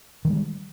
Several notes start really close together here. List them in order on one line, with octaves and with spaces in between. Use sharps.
D#3 F3 G#3 G3